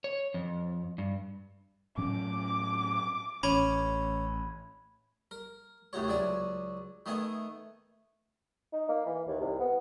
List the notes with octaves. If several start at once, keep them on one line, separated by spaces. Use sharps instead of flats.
C#5
F2
G2
A2 F#3 C#4 D6
A1 C#4 B5 G#6
A#4
D#2 A2 C3 F#4 C#5
C#2 F#3 D4 D5 G#5
D#3 A3 B3 D#5 G#5
D#4
A#3
E3
D#2
C2
B3